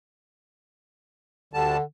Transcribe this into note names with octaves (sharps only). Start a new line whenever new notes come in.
D2 D3 G3 A5